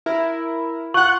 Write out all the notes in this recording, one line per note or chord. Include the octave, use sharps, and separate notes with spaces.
E4 A#4
F4 F#5 C#6 F#6